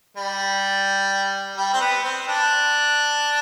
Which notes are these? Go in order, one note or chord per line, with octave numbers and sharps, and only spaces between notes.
G3
G3
C4
B3
C4
D4